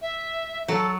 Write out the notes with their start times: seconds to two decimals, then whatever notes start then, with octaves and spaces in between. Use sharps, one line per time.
0.02 E5
0.68 F#3 A4